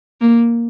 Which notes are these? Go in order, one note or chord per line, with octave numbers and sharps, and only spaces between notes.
A#3